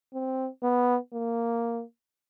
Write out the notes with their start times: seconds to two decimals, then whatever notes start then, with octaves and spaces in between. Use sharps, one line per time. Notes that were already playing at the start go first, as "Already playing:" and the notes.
0.14 C4
0.63 B3
1.13 A#3